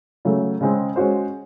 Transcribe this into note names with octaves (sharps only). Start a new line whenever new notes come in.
C#3 F#3 A3
C#3 G#3 C4
G#3 C#4 F#4 C5